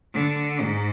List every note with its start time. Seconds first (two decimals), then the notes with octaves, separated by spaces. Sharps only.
0.14 D3
0.62 G#2